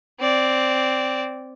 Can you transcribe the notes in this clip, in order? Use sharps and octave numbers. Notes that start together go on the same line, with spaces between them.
C4 D5